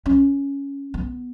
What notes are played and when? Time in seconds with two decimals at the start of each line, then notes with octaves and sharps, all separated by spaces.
0.06 C#4
0.94 B3